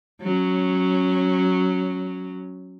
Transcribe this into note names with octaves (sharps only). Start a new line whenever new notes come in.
F#3 C#4